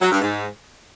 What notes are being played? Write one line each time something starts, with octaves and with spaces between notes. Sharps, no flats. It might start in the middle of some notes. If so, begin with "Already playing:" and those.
F#3
G2
G#2